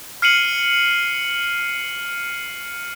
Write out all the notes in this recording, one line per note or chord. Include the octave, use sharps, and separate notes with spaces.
F6 C7 C#7 D#7 F#7